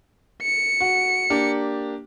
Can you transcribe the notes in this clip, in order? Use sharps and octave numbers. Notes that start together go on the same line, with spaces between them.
C#7
F#4
A#3 D4 G4